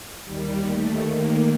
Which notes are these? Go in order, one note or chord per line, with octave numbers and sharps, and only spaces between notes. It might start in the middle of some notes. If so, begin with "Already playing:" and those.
D#2 D#3 G3
A3
A#3